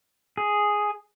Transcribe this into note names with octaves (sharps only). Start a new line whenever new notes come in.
G#4